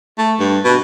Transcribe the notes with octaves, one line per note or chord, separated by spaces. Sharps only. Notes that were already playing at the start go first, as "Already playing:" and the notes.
A3
G2
B2